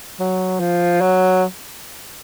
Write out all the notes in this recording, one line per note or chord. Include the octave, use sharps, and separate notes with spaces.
F#3
F3
F#3